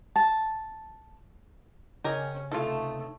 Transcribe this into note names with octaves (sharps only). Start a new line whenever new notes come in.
A5
C#3 C#4 G4 A#4 C#5 D#5
C3 A3 D#4 F4 A4